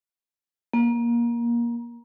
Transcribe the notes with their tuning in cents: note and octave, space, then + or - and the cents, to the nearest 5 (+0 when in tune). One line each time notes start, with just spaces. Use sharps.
A#3 +20